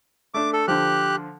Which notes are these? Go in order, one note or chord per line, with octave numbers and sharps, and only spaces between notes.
A3 D4 D6
A4
D3 F3 G4 F#6